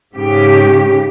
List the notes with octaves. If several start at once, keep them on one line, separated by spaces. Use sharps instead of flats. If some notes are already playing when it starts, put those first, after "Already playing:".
G#2 C#3 G4